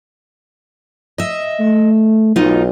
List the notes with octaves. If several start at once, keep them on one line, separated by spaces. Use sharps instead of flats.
D#5 E5
A3
B1 D#4 F4